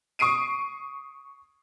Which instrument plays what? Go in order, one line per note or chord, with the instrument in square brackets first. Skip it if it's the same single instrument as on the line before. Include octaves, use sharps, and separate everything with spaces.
[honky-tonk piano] C#6 D#6 C7 D7 D#7